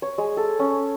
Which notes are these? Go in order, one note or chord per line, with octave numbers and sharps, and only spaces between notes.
C#5
G#3
A4
C#4